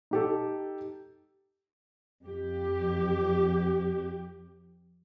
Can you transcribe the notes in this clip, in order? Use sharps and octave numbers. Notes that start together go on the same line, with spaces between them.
D#4 G4 A4
F2 G4